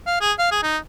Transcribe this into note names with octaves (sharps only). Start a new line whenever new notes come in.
F5
G#4
F5
G#4
D#4